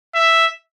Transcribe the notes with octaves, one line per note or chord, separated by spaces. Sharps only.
E5